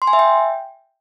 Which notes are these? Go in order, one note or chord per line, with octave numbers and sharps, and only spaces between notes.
C6
G#5
E5
G5